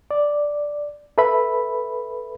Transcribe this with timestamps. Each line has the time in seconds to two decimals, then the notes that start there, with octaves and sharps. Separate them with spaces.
0.11 D5
1.18 A4 B4 E5 B5